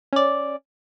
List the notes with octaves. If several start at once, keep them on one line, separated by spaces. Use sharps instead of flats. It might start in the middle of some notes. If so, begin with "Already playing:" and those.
C#4 D5